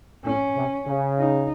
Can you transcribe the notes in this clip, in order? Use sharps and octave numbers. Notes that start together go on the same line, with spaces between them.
A2 C#4
C3
C#3
D#4